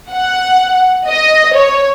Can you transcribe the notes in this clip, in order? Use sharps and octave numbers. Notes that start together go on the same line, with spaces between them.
F#5
D#5
C#5